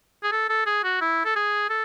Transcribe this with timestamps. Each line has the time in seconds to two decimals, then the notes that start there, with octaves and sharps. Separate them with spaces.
0.23 G#4
0.32 A4
0.49 A4
0.66 G#4
0.84 F#4
1.01 E4
1.25 A4
1.36 G#4
1.70 A4